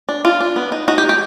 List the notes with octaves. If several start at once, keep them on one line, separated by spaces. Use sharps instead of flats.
D4
D4 F4
D4
B3
D#4
D#4 F#4
G4
G#3
G4